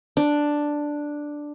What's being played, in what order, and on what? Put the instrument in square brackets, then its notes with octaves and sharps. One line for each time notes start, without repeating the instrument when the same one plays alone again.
[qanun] D4